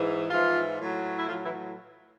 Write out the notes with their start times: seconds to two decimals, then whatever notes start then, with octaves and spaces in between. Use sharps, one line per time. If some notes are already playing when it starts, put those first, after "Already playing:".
Already playing: G#2 E3
0.30 G#2 E3 F3 F4
0.79 A2 F#3
1.19 E4
1.28 A2 F3 F#3 F4
1.45 E3 E4